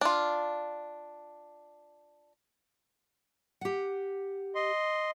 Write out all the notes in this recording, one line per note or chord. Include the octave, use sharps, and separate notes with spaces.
D4 F4
G4 F#5
D#5 C6